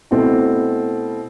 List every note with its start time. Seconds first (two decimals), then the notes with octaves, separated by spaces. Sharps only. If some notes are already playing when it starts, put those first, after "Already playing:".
0.11 B2 A3 C4 E4